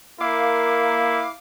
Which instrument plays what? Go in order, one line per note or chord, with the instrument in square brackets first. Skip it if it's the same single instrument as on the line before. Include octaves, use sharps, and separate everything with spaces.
[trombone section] A#3 [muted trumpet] E4 [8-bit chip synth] F5 D6